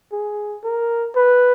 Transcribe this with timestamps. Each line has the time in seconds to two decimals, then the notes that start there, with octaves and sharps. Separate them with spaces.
0.12 G#4
0.63 A#4
1.15 B4